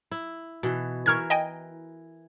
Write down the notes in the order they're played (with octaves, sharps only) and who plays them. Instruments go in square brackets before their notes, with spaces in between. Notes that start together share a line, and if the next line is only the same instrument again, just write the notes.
[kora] E4
B2 E3
[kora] E3 A#4 [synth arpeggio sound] C#6 F6 G#6
[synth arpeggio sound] D#5 G5 G#5